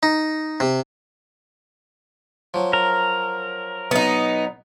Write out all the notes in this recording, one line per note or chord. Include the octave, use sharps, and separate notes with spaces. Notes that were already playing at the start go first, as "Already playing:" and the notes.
D#4
C3
F3 F#3
A#4
B1 B3 D#4